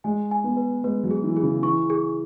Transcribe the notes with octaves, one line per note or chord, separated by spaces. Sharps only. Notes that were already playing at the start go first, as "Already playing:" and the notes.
G#3 G#5
G#5
B3
B4
G#3 B4
F#3
G#4
E3
G#4
C#3
E3 C#6
G#4